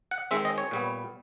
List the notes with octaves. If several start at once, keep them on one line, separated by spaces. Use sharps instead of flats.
F#5
D#3 G#3 C4 E5
D#5
C#5
A#2 G3 B3